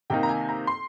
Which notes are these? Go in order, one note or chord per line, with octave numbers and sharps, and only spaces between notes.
C3 D#3 A#3 D#4 G5
A#5
G#5
A#5
C6